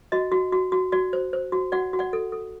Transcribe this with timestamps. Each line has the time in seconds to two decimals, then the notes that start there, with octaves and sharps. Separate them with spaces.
0.12 F#4 D#5
0.32 F#4
0.53 F#4
0.72 F#4
0.92 F#4 D5
1.13 C5
1.33 C5
1.52 F#4
1.72 F#4 D5 F#5
1.93 F#4
1.99 D5 F#5
2.13 A4
2.32 A4